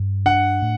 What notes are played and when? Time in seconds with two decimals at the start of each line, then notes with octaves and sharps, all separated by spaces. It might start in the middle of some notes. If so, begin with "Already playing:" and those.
Already playing: G2
0.26 D4 F#5
0.62 A2